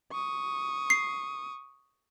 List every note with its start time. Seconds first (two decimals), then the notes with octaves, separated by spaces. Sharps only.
0.12 C#6 D#6
0.90 C7